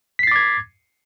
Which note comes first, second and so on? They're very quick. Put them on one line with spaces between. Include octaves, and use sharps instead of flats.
B6 C7 A6 D6 G#6